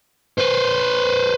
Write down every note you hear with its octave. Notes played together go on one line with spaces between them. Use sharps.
B4 C5